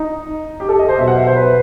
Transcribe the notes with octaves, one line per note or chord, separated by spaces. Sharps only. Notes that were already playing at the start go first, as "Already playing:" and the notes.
Already playing: D#4
G4
A4
D#5
C5
B2 F#3 E5
F#5
E5
C5
B4